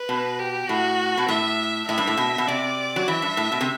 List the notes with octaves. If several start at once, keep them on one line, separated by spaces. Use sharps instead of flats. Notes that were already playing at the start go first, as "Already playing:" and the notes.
Already playing: B4
B2
G4
A2 F#4
B2
A2 E5
A2 E5
G2
A2
B2
B2
C3 D5
F#3
E3 E5
G2
A2
B2
C3